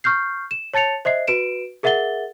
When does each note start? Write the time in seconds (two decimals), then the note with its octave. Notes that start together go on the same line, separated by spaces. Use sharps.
0.04 C#6 F6 G6 C7
0.51 E7
0.74 C#5 A5 A6 C#7 F7
1.05 C5 D#5 E5 C7
1.27 F#4 B4 D7 E7
1.83 G#4 A#4 E5 F#5 A6 G7